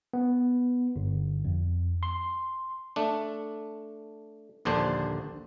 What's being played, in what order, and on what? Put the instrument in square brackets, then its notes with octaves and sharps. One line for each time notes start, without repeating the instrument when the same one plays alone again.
[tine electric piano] B3
G1
F2
C6
[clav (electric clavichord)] A3 D4
A#1 D#2 D3 D4 C5